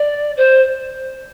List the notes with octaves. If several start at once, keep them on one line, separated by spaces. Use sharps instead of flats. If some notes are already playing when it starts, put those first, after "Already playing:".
Already playing: D5
C5